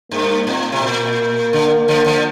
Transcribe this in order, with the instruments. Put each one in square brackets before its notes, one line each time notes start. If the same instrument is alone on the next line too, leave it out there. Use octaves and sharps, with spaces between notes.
[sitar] G2 [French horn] A#3
[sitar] A2 [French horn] C4
[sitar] C3
[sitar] A#2 [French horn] A#3
[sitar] D3
D3 F3
D3 F3